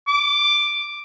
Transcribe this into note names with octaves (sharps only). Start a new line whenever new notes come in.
D6